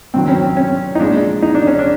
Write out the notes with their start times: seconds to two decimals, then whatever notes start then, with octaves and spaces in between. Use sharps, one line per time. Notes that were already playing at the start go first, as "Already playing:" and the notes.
0.14 G2 D#3 F#3 C4
0.28 C#4
0.42 C4
0.57 C#4
0.95 D#4
1.00 A#2 F3 G#3 D4
1.42 D#4
1.55 D4
1.67 C#4
1.79 D4